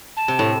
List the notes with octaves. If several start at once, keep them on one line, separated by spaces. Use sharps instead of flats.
A5
C3
A2